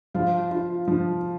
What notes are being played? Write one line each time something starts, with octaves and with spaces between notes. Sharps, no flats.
F3 F4 F5
F4
F3